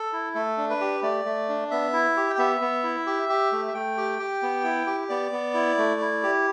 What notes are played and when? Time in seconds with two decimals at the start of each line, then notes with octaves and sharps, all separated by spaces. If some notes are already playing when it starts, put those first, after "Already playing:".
Already playing: A4
0.13 E4
0.35 A3 A4
0.57 D4
0.70 B4
0.81 G4
1.03 A3 D5
1.25 A3
1.49 D4
1.71 B3 E5
1.93 E4
2.17 G4
2.30 G5
2.38 B3 E5
2.61 B3
2.83 E4
3.06 G4
3.29 G4
3.52 A3
3.68 E5
3.74 A3 G5
3.97 G4
4.19 G4
4.42 B3
4.64 E4
4.87 G4
5.09 B3 D5
5.32 B3
5.54 E4
5.78 A3
6.01 E4
6.23 G4